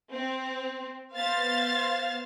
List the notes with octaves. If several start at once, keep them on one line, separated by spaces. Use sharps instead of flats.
C4
B3 C5 F5 A6